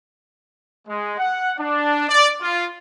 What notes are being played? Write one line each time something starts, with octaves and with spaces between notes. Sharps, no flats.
G#3
F#5
D4
D5
F4